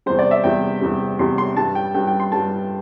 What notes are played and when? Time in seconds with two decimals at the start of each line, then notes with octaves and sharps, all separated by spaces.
0.06 E2 C3 G3 C5
0.19 D5
0.31 E5
0.44 E2 C3 G3 G5
0.81 E2 C3 G3
1.19 E2 C3 G3 C6
1.38 C6
1.57 G2 G3 A5
1.75 G5
1.94 G2 G3 G5
2.07 G5
2.20 C6
2.32 G2 G3 A5